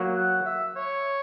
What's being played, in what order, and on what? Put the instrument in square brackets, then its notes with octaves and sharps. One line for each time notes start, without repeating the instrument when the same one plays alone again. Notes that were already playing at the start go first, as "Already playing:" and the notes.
Already playing: [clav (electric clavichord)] F#3 A#3
[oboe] F#5
E5
C#5